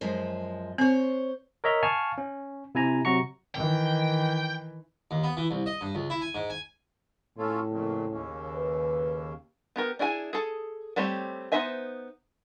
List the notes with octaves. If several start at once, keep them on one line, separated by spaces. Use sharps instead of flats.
F#2 F3 G#3
C4 C5 C#5
A#4 C#5 D#5 E5 A#5
F5 G#5 A5 C#6 F6
C#4
C3 E4 G#5 A#5
C3 F#3 F#4 A#5 C#6 C#7
D#3 E3 G5
D#2
B3
E3
C2
D#5
G2
C#2
E4
G#5
G#2
G#5
A2 C#4 F4 A4
F2 A#2 C#3
D#2 C#3
B4
B3 G4 A#4
D4 E4 G#4 G#5
G#4 A4
G3 A3 C4 G4 C#5
B3 D#4 C5 E5 G#5